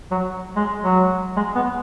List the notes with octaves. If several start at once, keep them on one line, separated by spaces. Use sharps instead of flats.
F#3
G#3
F#3
G#3
B3